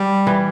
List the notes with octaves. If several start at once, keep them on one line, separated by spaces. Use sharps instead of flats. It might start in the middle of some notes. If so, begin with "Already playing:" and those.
Already playing: G3
E3